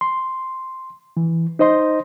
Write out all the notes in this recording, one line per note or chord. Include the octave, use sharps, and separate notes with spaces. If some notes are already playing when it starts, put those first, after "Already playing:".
C6
E3
D#4 C5 D#5 C6